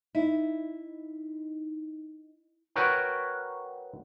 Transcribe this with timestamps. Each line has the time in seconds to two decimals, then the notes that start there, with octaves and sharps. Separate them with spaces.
0.15 D#4 E4
2.76 F#4 A#4 B4 C#5 G5